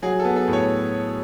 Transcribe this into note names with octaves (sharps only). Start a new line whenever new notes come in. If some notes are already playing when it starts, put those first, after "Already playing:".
F#3 G#4
A4
B3
A4
A2
C#5